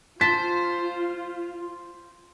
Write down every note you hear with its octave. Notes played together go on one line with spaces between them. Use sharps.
F4 C5 A5 B6